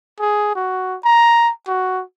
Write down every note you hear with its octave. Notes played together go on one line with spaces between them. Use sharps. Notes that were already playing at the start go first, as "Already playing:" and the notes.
G#4
F#4
A#5
F#4